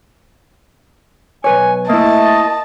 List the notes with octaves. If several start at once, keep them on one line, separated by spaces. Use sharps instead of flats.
B1 B4 C#5 G#5
A3 A#3 E4 D#5 A5